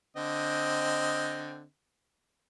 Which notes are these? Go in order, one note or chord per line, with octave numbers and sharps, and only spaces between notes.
D3 C4 D#5